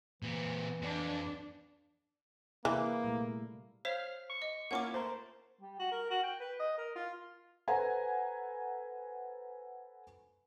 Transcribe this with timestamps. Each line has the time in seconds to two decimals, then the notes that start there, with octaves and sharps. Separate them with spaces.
0.23 A#2 E3 C4
0.82 F2 D4
2.65 C3 E3 A#3 E4 G#4
3.04 A#2 G3 A3
3.85 C5 C#5 F5 B6
4.30 C#6
4.42 D#5
4.71 A#3 C#4 E4 F4 F#5 C#6 D6
4.94 A3 A#4 C5
5.61 G3
5.79 F#4
5.92 A#4
6.10 F#4
6.23 G5
6.40 B4
6.60 D#5
6.78 A#4
6.95 F4
7.68 A4 B4 C5 F#5 G#5 A#5